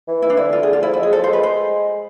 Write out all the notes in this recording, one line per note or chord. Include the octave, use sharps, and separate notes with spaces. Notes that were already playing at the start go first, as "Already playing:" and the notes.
E3
E3 E4
D4
D3 E4
F4
G#4
F4
F3 E4
G#3 E4
G#4
F3 A4
C5
G#3 B4
C5